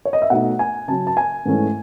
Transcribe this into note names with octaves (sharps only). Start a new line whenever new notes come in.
C#5
D#5
E5
B2 A3 D#4 F#5
G#5
C#3 F#3 C#4 A5
A5
G#5
G#2 E3 A3 C#4